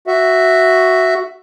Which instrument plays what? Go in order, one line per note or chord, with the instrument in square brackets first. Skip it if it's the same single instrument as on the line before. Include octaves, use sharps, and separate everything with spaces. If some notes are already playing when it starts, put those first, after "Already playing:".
[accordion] F#4 E5